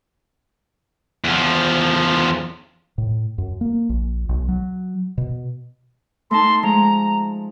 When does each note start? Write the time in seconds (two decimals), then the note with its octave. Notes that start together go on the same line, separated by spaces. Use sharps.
1.24 E2 F3
2.98 A2
3.38 F#2
3.61 A#3
3.89 A#1
4.29 B1
4.49 F#3
5.18 B2
6.31 A3 D#4 A5 C6
6.63 F3 G#3 A#5